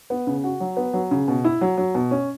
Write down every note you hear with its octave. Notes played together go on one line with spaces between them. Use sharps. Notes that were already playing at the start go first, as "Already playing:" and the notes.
B3
C#3
F#4
F#3
B3
F#3
C#3
B2
E4
F#3
F#3
B2
C#4